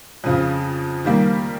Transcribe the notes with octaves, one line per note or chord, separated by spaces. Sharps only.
F2 C#3 F3
D#3 G3 A#3